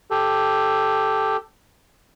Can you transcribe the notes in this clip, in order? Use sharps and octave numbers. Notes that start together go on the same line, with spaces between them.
G4 A4